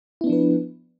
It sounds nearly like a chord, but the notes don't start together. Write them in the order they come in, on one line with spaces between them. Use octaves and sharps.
E4 B3 D4 F3 B4